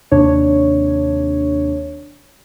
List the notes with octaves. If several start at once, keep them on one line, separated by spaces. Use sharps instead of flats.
D#2 C3 D4 C#5